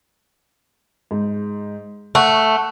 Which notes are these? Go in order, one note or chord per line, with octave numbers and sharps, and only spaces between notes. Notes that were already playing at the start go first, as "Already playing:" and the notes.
G#2
A3 F#5 C#6 F#6